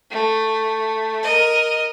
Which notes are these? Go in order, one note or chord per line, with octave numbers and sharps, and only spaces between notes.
A3
A#4 D#5